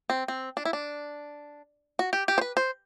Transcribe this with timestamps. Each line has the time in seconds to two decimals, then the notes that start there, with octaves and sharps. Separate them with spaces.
0.10 C4
0.28 C4
0.57 D4
0.65 E4
0.73 D4
1.99 F#4
2.13 G4
2.28 G4
2.38 C5
2.41 B4
2.57 C5